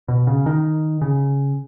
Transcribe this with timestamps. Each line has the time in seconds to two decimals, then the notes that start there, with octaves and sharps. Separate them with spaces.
0.08 B2
0.27 C#3
0.46 D#3
1.02 C#3